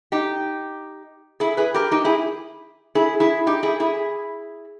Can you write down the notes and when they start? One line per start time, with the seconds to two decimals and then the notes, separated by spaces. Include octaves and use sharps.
0.12 D#4 G4
1.40 E4 G#4
1.57 G#4 B4
1.74 G4 A#4
1.91 D#4 G4
2.04 E4 G#4
2.95 E4 G#4
3.20 E4 G#4
3.47 D#4 G4
3.63 E4 G#4
3.80 E4 G#4